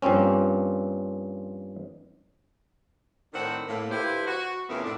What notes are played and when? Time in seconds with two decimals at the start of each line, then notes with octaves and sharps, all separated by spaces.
0.02 G2 F3 A#3 C4 C#4
3.34 A2 D#3 C4 D4 C5 F#5
3.68 A2 A#3
3.91 D3 E4 F4 G4 B4 C5
4.27 F#4
4.69 F2 C#3 A3 B3 E4 A#4
4.84 A2 D4